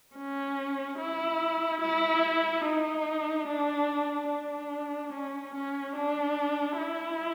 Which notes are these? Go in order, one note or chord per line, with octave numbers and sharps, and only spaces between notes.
C#4
E4
E4
D#4
D4
D4
C#4
C#4
D4
E4